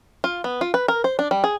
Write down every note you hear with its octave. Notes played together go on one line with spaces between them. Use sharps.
F4
B3
F4
B4
A#4
C5
D4
G3
G#4